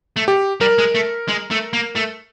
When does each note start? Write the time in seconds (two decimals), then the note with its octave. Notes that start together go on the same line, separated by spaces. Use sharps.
0.16 A3
0.28 G4
0.60 G3 A#4
0.78 G#3
0.95 A3
1.28 G#3
1.51 A3
1.73 A#3
1.96 A3